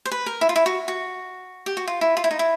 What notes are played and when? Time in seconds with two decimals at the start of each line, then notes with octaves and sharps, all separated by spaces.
0.05 C5
0.11 B4
0.26 A#4
0.41 E4
0.49 F4
0.56 E4
0.66 F#4
0.88 F#4
1.66 G4
1.77 F#4
1.88 F4
2.01 E4
2.17 F4
2.24 E4
2.31 D#4
2.39 E4